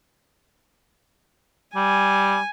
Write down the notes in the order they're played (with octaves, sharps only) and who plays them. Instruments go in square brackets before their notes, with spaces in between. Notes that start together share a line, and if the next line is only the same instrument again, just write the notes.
[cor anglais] G3 [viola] G#5